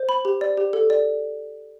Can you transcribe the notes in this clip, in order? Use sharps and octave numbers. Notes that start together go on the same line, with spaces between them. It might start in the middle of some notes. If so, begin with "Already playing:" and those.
Already playing: C5
B5
G4
D5
G4
A4
D5